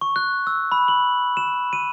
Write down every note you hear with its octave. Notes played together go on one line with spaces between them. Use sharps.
C#6
F#6
E6
B5
F#7
E7
D#7